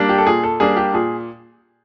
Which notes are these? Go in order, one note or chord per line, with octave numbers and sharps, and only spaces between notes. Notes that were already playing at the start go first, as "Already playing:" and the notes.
Already playing: G3 A#3 D4
G4
A4
A#2 G#4
A4
G3 A#3 D4 G#4
G4
A#2 G#4